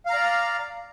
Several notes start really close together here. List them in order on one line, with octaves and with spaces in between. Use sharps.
F5 A#5 D5